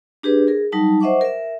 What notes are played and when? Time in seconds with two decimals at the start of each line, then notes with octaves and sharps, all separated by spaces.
0.23 D4 G4 G#4 B4
0.47 G#4 A#4
0.72 F#3 G3 D#4 A5
1.01 C5 D#5 E5 F#5 C#6 D6
1.21 A#4 E5